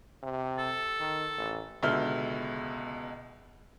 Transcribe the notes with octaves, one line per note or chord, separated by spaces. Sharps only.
C3
A4
D#3
A1
C#2 B2 D3 E5 F6 G7